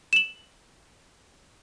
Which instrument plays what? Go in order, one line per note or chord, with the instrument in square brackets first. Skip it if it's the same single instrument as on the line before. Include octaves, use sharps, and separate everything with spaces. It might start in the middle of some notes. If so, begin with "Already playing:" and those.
[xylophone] E7 F#7